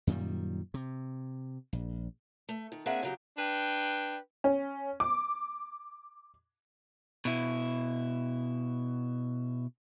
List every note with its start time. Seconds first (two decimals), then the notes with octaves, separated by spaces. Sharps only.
0.07 F#2 A#2 D#3 G3
0.74 C3
1.73 A#1
2.49 A3
2.72 D#3
2.86 A#3 C4 D4 G#4 E5 F#5
3.03 C#3 F#3 G4
3.38 D4 B4 G5
4.44 C#4
5.00 D6
7.25 B2 E4